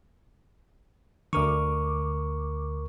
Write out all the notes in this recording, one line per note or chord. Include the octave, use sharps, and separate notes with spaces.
D2 D3 A#4 C#6 D6